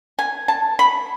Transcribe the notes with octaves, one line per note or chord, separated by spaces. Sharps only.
G#5
A5
B5